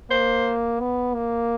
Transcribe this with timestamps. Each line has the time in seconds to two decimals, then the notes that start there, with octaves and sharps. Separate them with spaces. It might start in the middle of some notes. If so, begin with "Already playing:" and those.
0.10 A#3 C5
0.80 B3
1.15 A#3